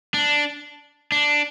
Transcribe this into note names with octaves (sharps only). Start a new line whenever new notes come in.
D4
D4